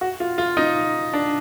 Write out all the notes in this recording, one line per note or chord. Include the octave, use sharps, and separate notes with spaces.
F#4
F4
F4
D#4
D4